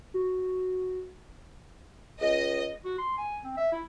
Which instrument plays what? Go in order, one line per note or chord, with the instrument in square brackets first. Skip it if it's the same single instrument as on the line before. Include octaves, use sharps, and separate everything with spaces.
[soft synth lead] F#4
[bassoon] C#2 [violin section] D#5
[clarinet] F#4
C6
G#5
C4
E5
E4